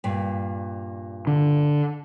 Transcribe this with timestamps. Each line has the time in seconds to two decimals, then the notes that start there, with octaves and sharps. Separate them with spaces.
0.04 G2 A#2
1.27 D3